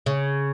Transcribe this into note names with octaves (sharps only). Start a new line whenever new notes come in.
C#3